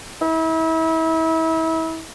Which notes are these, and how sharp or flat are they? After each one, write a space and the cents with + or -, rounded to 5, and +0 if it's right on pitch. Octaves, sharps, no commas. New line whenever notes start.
E4 -35